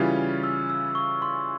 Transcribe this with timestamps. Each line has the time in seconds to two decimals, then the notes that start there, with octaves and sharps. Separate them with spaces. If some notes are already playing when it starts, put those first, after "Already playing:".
Already playing: C#3 E3 G3 C#4 F4
0.43 E6
0.70 E6
0.95 C#6
1.22 C6